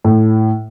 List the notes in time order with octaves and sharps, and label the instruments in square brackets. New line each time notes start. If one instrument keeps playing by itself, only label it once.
[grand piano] A2